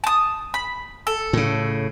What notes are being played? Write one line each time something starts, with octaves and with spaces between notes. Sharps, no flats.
A5 D#6
B5
A4
A2 C#3